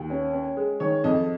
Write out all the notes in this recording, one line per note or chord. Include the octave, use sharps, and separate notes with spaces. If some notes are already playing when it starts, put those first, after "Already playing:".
Already playing: D#2
C#4
C#4
G#3
D#3 C#5
F2 D#5